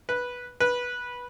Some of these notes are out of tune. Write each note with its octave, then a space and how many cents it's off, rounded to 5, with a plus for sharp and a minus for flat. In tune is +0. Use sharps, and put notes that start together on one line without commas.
B4 -10
B4 -15